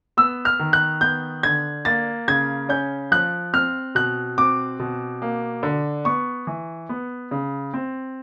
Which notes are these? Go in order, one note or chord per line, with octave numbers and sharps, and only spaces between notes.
B3 E6
F6
D#3
F#6
B3 G6
D3 G#6
A#3 A6
C#3 G#6
C#4 G6
F3 F#6
C4 F6
B2 F#6
C4 D6
B2
A#3
D3
B3 C#6
E3
B3
C#3
C4